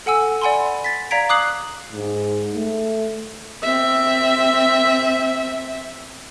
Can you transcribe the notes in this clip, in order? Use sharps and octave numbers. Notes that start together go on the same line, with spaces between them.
A4 F#5 G#5 E6
D5 F#5 G#5 B5 C6
A6 B6
D5 F5 A#5 G#6 B6 D7
D6 D#6 F#6 C7 F#7
G#2
A3
C4 E5